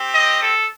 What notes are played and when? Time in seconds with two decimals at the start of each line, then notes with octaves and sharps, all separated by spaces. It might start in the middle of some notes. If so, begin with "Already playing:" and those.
Already playing: C4 G4
0.13 D#5
0.41 A4